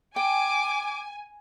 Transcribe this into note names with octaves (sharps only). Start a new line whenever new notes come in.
G5 G#5 D6